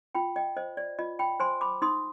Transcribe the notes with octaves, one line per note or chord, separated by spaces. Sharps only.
F4 G5 B5
D#5 G5
C5 D#5
D5
F4 D#5
G5 B5
C5 G#5 C6
B5 D6
D#4 C6 D#6